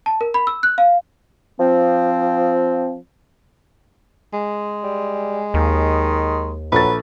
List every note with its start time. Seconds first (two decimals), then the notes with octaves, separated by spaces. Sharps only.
0.06 A5
0.21 A#4
0.34 B5
0.47 E6
0.63 F#6
0.78 F5
1.58 F3 C4
4.33 G#3
4.83 G3
5.54 D#2 D#3
6.72 A#1 F#3 A4 B4 A6